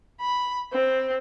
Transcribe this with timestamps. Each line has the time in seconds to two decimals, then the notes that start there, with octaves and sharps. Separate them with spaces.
0.21 B5
0.73 C4